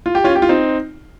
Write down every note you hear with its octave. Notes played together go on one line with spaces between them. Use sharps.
F4
G4
C#4 F4
G4
F4
C4 D#4